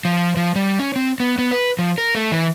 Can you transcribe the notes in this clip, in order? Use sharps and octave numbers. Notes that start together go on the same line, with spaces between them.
F3
F3
G3
C#4
C4
B3
B3
B4
F3
A#4
A3
E3